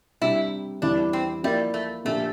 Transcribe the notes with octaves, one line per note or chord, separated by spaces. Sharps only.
C3 G3 D4 E4 G4
E2 E3 G3 C4 D4 E4
C4
F3 G3 A#3 E4 A#4 E5
A3
A#2 F3 A3 A#3 D4 G4